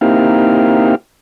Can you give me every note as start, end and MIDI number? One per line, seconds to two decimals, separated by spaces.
0.01 0.95 58
0.01 0.95 60
0.01 0.95 63
0.01 0.95 64
0.01 0.95 67
0.01 0.95 77